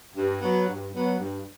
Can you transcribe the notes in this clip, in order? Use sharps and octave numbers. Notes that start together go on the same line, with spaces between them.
G2
F#3 B3
G2
F#3 B3
G2